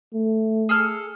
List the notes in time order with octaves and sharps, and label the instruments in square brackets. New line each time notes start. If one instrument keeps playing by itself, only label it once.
[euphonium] A3
[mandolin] G#4 A4 F6